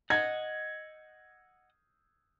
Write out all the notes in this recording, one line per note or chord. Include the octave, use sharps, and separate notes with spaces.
D#5 F#5 G#6